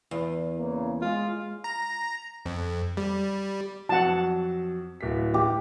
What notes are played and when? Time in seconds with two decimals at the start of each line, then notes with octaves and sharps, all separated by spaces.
0.11 E2
0.58 C#3 E3 A#3
1.02 G#3 F4
1.64 A#5
2.46 F2
2.97 G3
3.89 F2 F#3 F#5 A5
5.01 D1 B6
5.34 G4